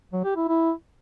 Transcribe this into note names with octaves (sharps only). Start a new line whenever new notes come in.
F#3
G4
E4
E4